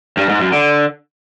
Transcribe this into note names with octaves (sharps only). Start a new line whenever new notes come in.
G2
G#2
F#2
D3